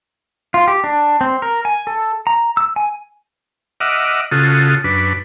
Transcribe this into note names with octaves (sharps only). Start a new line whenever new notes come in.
F4
G4
D4
C4
A#4
G#5
A4
A#5
E6
G#5
D#5 E5 F#5 D6 F6
C#3 F4 F#4 A4 D#6
F#2 D4 B4